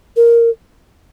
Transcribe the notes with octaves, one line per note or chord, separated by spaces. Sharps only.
A#4